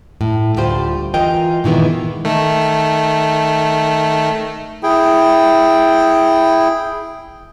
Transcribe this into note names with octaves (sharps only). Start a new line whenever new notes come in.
A2
D2 G3 F4 G4 C5
E3 F4 A#4 D#5 G5
A#2 D#3 E3 G#3 B3
D#3 A3
E4 G#4 G5